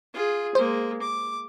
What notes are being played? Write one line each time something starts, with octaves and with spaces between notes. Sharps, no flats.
F4 G#4
G#3 A#3 C5
D6